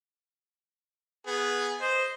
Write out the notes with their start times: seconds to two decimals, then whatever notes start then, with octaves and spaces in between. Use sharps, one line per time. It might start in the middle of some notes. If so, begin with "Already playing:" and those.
1.27 B3 G#4
1.81 C5 D#5